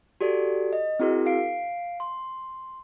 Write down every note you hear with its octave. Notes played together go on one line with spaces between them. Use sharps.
F#4 G4 A4 D5
D#5
C4 E4 F#4 G#4 A#4
F5 C7 D7
C6